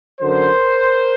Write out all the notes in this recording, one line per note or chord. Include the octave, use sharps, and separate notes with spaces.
F#2 D3 F#3 A#4 C5